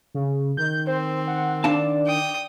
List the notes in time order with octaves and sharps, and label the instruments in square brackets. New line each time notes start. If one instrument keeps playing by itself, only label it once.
[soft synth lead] C#3
[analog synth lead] D#3 [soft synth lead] G6
[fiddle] C4 [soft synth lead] C5
[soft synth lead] F#5
[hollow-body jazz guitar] D4 F5 A5 [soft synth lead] D5
[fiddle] G5 D#6